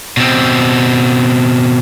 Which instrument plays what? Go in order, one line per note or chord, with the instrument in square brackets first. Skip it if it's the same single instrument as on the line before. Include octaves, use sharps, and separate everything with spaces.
[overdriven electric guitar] B2 C4